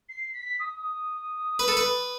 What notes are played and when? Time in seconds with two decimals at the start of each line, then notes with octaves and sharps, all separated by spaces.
0.09 C7
0.34 B6
0.59 D#6
1.59 B4
1.68 A4
1.77 B4